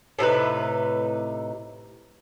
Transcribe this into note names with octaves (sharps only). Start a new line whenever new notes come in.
A2 C3 D#4 B4